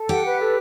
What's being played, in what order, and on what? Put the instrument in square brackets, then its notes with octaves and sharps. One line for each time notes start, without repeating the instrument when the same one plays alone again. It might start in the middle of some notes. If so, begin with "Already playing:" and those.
Already playing: [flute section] A4
[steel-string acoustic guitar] G4 [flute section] F#5
[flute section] B4
A4